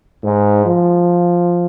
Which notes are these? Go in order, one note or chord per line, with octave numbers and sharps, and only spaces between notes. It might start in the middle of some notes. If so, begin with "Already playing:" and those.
G#2
F3